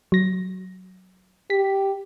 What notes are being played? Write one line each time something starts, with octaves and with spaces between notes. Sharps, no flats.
F#3 A#6
G4 B6